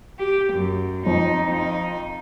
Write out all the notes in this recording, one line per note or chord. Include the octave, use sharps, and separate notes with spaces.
G4
F#2
F2 D#4
F3 D#4